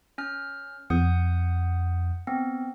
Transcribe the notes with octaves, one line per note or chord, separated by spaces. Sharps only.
C#4 F6
F2 F#5 D#6 G6
B3 C4